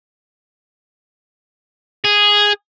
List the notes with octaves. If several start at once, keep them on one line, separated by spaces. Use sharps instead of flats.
G#4